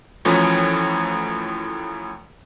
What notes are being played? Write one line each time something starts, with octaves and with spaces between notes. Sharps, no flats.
F#2 A2 E3 F3 C#4